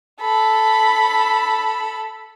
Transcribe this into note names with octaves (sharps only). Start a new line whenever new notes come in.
A4 B5